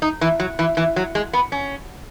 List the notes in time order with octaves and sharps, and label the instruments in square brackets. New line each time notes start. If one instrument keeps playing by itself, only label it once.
[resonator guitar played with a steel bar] D#4
E3
F#3
E3
E3
F#3
G#3
B3
C#4